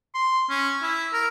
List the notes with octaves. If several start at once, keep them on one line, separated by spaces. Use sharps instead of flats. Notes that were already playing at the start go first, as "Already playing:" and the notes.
C6
C#4
E4
A#4